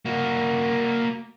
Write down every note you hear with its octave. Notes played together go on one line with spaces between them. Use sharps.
A#3 F#4